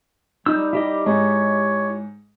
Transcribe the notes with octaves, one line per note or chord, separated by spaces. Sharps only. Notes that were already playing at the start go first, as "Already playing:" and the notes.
G3 D#4 E6 G6
E4 G4 D#5
G#2 C#5